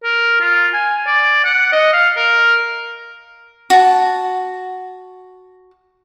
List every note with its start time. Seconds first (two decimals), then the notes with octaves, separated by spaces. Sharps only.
0.04 A#4
0.41 F4
0.74 G#5
1.07 D5
1.44 F#5
1.73 D#5
1.93 F5
2.16 A#4
3.70 F#4 A5